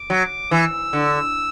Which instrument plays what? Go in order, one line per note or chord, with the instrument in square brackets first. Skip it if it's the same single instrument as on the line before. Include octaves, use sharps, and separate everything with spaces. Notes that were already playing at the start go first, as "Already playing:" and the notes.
Already playing: [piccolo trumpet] D6
[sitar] F#3
[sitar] E3 [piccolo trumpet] E6
[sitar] D3